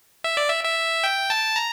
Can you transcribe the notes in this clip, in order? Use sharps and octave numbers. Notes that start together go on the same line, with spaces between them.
E5
D5
E5
E5
G5
A5
A#5